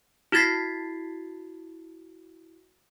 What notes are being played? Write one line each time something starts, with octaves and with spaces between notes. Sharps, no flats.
E4 F#4 G#6 A6 B6 C7